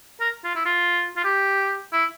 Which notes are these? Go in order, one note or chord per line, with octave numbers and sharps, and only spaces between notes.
A#4
F4
E4
F4
F4
G4
E4